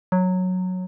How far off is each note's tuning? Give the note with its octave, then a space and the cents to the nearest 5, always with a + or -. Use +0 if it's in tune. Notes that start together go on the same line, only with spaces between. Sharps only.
F#3 -10